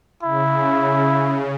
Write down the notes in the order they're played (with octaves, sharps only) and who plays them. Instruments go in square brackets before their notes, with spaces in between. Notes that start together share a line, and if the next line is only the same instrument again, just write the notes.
[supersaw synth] C#3 [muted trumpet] E4